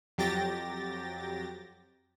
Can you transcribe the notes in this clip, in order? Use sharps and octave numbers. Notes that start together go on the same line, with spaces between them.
F2 F#3 G4 G5 A6 A#6